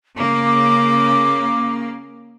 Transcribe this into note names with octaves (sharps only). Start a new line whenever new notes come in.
C#3 A#3 D6